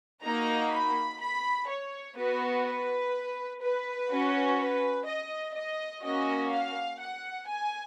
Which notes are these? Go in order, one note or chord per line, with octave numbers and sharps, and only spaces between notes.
A#3 D#4 F#4 A#5
B5
B5
C#5
B3 F#4 B4
B4
B4
C#4 F#4
B4
D#5
D#5
A#3 C#4 F#4 D#5
F5
F#5
G#5